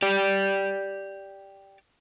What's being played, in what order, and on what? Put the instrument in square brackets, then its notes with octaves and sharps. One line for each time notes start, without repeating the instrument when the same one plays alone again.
[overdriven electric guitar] G4 D5